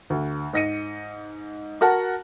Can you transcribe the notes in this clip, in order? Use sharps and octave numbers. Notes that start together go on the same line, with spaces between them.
D2
G#2 D#5 A#6 C#7 D#7
F#4 A#4 F#5 A5